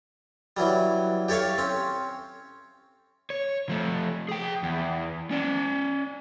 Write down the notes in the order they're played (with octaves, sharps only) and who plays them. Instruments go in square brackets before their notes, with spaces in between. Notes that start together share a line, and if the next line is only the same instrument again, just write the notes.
[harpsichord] E3 F#3 G3
G4 A4 C#5 E5 F5
C4 C#4
[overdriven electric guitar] C#5
F3 A3
G#4 G5
E2
C#4 D5